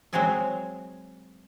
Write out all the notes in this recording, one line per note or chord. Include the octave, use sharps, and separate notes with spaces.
F#3 G#3 C4 F#4 G#4 E5